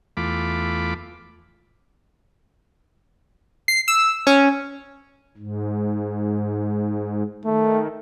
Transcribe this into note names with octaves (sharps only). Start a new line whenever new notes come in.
E2 A3 F4 B5 D6
C7
E6
C#4
G#2
D#3 A3